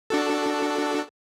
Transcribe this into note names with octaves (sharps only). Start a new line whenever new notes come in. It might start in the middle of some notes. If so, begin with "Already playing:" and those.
D4 F#4 A4